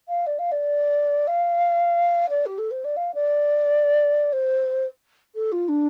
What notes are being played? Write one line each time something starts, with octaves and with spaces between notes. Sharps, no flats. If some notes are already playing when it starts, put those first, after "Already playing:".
F5
D5
F5
D5
F5
D5
G4
A4
C5
D5
F5
D5
C5
A4
F4
D4